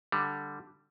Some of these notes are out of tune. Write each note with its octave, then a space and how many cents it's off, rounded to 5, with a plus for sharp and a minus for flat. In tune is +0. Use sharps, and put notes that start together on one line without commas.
D3 +0 G3 +0